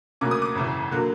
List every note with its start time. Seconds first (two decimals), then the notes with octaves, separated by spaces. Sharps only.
0.21 D2 C#3 F#3 A#3 C#4 D6
0.31 D#6
0.42 D6
0.55 G#1 F#2 C#3 E3
0.91 D3 F#3 A#3